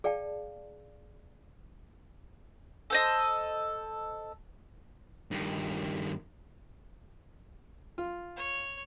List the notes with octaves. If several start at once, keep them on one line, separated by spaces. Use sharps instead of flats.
G#4 D5 F5 G5 A5
A4 C5 D#5
G2 D#3
F4
C#5